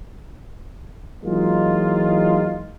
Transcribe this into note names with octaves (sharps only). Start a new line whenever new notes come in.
E3 F#3 G#3 A#3 D#4 F4